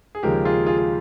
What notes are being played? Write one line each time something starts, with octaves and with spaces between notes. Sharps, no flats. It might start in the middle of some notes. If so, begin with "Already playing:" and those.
G#4
D#2 C#3 F3 G#3 G4 A#4
F4 G#4
F4 G#4
F4